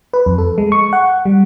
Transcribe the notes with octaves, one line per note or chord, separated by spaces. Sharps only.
B4
F2
A4
G#3
C#6
F#5
G3